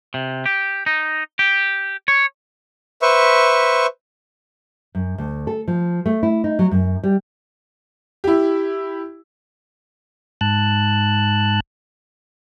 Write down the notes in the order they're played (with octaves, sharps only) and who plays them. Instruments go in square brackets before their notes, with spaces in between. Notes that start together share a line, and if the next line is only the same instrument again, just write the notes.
[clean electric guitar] C3
G4
D#4
G4
C#5
[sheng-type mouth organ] B4 C5 E5 C#6
[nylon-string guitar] F#2
D2
A4
F3
A3
E4
D#4
F#3
F#2
G3
[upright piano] E4 G4
[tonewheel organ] G#2 A5 F#6